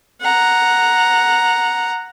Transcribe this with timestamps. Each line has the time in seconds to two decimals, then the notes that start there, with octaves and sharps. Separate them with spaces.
0.21 F#5 A#5